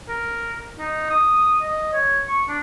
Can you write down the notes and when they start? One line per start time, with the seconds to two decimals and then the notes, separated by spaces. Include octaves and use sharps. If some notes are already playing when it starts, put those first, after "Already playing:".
0.09 A#4
0.79 D#4
1.10 D#6
1.62 D#5
1.93 C#5
2.28 C#6
2.48 D4